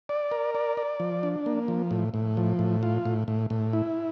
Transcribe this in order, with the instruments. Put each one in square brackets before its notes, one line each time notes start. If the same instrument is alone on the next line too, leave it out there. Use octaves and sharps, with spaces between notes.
[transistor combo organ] D5
A#4
D5
D5
F3
D4
A#3
F3
A2
A2
F3
A2
F4
A2
A2
A2
E4